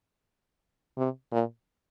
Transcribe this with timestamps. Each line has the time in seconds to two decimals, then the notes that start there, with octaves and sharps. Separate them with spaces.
0.97 C3
1.32 A#2